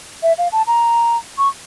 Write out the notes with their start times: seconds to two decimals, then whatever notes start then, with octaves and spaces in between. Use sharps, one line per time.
0.23 E5
0.38 F5
0.52 A5
0.67 A#5
1.38 C#6